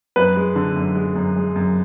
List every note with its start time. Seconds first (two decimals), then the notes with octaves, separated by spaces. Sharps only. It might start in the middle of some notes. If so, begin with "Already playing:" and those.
0.16 F#2 B4
0.36 G#3
0.56 D3
0.76 F#2
0.95 G#3
1.16 F#2
1.36 G#3
1.56 F#2